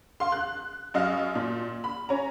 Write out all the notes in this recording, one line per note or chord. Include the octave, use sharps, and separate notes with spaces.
F5 C6
F#6
F#2 D#5 F5 F6
A#2
B5
C#4 A#5